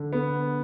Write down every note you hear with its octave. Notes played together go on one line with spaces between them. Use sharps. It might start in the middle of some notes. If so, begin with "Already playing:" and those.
Already playing: D3
B3